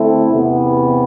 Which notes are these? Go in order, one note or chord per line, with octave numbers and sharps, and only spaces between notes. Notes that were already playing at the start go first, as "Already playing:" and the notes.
Already playing: D3 A3 C4 E4
E2 C3 E3 B3